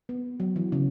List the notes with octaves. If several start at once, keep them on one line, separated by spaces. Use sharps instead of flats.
B3
F#3
E3
C#3